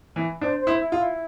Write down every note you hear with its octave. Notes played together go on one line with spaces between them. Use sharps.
E3
D4 C5
C5
E4
E4
F4
E4